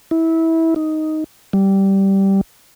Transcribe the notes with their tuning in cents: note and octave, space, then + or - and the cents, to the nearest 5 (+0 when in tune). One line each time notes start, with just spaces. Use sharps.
E4 -20
D#4 +5
G3 -10